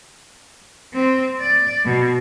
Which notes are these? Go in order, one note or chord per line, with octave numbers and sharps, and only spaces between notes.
C4
D5
B2